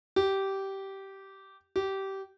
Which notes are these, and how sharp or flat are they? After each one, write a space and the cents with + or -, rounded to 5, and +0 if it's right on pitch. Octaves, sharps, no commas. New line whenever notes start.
G4 -15
G4 -20